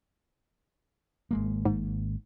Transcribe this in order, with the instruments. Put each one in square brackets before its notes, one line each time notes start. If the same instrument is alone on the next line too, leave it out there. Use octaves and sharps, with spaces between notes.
[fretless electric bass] G#1 G#3 A#3
[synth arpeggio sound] G#2